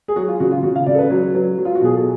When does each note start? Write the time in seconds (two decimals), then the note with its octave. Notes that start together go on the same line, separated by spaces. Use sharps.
0.08 G#4
0.16 F#3 F#4
0.28 F4
0.40 C#3 F#4
0.51 F4
0.63 C#3 F#4
0.76 F5
0.86 C#3 D5
0.95 A4
0.99 B4
1.10 F#3
1.34 F#3
1.58 F#3
1.65 F4
1.75 F#4
1.81 B2 G#4
1.94 A4